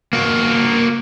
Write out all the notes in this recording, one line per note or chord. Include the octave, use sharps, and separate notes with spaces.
A#3 F#4